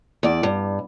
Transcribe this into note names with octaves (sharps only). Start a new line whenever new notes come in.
E2 D5
G2